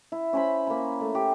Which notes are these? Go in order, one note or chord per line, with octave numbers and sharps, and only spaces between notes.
E4
C#4 C5 B5
A#3 B5
A3
G4